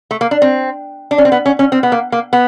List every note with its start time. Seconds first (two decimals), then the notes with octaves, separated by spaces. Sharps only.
0.11 A3
0.21 A#3
0.31 D4
0.42 C4
1.11 D4
1.18 C#4
1.25 C4
1.32 B3
1.46 C#4
1.59 C#4
1.72 C4
1.83 B3
1.92 A#3
2.12 A#3
2.33 B3